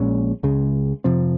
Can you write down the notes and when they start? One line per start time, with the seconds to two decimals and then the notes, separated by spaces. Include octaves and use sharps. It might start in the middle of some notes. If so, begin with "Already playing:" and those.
Already playing: A#1 A#2 G#3 C#4
0.43 C#2 C#3 G#3
1.04 F2 C3 F3 C4